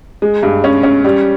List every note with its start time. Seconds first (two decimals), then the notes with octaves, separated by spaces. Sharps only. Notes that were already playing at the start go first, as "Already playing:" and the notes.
0.22 G#3
0.43 G2
0.64 C#4
0.83 C#4
1.04 G3